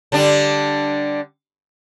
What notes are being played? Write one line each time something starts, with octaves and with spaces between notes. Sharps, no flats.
D3 G3 D4